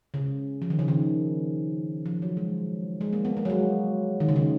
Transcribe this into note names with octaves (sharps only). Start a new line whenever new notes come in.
C#3
F3
D#3
C#3
D#3
F3
F#3
G#3
G#3
A#3
B3
A#3
F#3
G#3
D#3
C#3
D#3